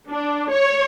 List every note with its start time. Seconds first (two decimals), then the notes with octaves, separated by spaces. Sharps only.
0.11 D4
0.51 C#5